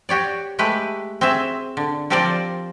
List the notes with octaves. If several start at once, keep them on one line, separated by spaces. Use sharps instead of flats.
F#4 G4 C#5 D5
G#3 A3 G4 B4
C4 F#4 G#4 E5
D3
F3 C4 G4 A#4 C5 D5